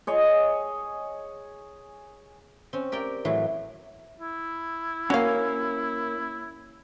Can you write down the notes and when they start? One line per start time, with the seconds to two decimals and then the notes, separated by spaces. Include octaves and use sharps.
0.07 G#4 C#5 D#5
2.73 C4 C#4
2.92 G4 A#4 D5 G5
3.25 A2 E3 F#3
4.20 E4
5.10 A#3 C#4 F#4 F5